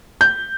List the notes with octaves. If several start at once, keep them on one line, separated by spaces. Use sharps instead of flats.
G6